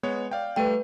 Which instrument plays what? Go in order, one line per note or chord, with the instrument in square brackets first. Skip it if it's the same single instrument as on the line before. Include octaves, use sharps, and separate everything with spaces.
[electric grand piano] G#3 B3 C#5
D5 F5 G5
[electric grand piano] G3 A3 D#7 [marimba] B4 G5